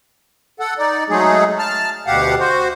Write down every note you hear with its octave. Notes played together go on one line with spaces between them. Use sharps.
A4 F#5
D#4 D5
F#3 G#3 A3 D#4 G#4
A5 F6
D2 B2 G4 F5 F#5
F#4 C5